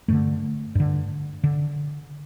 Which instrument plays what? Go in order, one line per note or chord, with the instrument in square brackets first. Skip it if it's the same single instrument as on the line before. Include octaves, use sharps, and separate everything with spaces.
[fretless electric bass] G2 D3 A3
G2 D3
D3